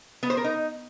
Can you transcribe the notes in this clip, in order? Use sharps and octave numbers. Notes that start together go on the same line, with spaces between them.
B3
C5
A#4
D#4